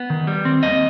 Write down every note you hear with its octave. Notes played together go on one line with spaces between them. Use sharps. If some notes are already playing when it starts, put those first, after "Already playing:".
Already playing: B3
D#3
G3
C4
D#2 D#5